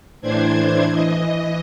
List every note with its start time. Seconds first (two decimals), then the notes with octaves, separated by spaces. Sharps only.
0.22 A2 E3 D4 C5 G#6
0.91 E3 D#5